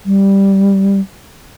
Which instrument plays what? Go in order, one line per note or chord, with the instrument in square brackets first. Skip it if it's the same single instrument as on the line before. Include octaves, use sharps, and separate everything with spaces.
[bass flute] G3